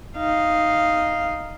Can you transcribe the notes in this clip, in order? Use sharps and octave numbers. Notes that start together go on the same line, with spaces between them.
D#4 F5